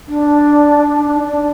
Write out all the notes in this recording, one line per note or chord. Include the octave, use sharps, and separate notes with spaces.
D4
D4